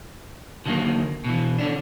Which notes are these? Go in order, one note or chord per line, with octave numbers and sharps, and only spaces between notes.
D3 D#3 F#3 A3 A#3
B2 E3
D3 C#4 D4